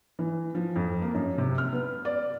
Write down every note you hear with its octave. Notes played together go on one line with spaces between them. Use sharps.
E3
F3
F2
A#3
F#2
C3
F6
B3
D5